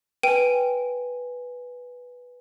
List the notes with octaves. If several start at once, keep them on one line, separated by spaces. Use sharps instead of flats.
B4 G5 G#5 D#7